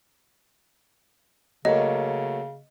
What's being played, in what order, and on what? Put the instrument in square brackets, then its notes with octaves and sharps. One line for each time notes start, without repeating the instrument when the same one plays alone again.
[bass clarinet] C#3 [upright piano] F#3 A3 A#3 [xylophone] D#5